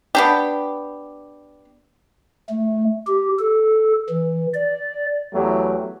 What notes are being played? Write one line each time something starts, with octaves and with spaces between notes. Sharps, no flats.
B3 D4 G4
A3
G4
A4
E3
D5
E2 F#3 A3 E4 G4